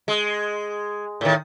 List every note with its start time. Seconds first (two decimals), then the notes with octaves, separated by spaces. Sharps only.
0.08 G#3
1.21 A2 D#3